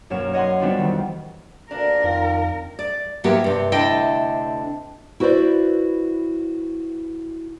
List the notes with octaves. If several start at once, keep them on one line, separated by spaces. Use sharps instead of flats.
B1 F#2 A#3 C#5 E7
C#5 D#5 F#5 C6
G3 B3 C4 D4 F4 F#4
F2 D#3 E3
D2 A#2 D4 A#4
F2 D#3 F4
D5
G#2 E3 F#3 A#3 B3 G4
G2 C3
D2 C3 D4 E4 D#5 G5
E4 F#4 B4 C5 D5